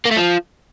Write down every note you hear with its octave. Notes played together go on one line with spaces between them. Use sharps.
A#3
A3
F3